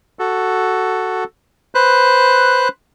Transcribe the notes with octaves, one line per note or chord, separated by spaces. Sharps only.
F#4 A4
B4 C5 F#6